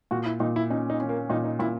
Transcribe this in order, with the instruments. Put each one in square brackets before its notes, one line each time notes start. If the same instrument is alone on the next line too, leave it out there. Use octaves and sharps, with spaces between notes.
[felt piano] A#2 [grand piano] F#4
[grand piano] E4
[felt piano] A#2 [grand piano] D#4
[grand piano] E4
[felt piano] C#4 [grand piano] D#4
[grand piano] D#4
[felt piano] C#4
[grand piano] A#3
[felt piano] A#2 [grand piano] D#4
[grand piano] D#4
[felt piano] A#2 [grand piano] E4